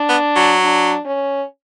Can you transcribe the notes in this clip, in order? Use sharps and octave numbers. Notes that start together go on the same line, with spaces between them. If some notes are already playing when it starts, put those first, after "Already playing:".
Already playing: D4
B3
F#3
D4
C#4